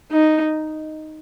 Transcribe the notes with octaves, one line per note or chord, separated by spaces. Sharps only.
D#4